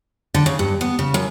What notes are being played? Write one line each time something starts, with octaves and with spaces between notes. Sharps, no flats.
D3
C#3
G2
B3
C#3
F#2